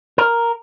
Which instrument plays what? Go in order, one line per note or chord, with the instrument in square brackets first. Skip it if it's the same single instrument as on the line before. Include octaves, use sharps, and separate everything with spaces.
[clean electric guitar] A#4